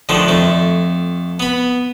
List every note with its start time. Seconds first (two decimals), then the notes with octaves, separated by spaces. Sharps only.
0.09 D3 D#3 F3 A3
0.28 F2 A3
1.40 B3 B5